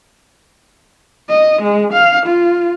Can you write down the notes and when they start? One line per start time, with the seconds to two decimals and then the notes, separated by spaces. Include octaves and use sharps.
1.29 D#5
1.62 G#3
1.93 F5
2.27 F4